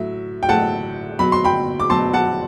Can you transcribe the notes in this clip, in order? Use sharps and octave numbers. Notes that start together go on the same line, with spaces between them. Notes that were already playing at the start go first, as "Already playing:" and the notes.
Already playing: A2 F#3 E5
G5
A2 F#3 F#5 A5
B2 F#3 B5
C6
G5 B5
D6
B2 F#3 A5 C6
F#5 A5